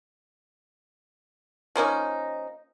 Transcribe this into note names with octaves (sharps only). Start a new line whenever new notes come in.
F3 A#3 C#4 D#4